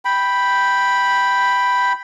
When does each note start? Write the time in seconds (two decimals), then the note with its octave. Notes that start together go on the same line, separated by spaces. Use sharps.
0.05 G5 B5